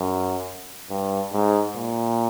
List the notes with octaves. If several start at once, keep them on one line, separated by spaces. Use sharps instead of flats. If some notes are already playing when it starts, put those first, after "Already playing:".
Already playing: F#2
G2
G#2
A#2